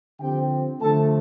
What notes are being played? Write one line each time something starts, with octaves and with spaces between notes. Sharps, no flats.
D3 F3 C4 G4 G5
D3 F3 A3 A4 A5